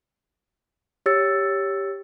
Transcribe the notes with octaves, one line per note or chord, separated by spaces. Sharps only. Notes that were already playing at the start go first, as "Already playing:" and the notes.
G4 C#5 E6 A6 C#7